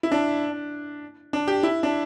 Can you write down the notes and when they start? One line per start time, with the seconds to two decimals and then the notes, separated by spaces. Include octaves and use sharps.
0.03 E4
0.12 D4
1.33 D4
1.48 G4
1.63 E4
1.83 D4